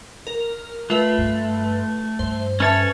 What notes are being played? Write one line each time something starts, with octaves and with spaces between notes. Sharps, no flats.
A#4
A3 F4 B4
G2
G2 C5
C#4 A4 B4 C#5 E5 A5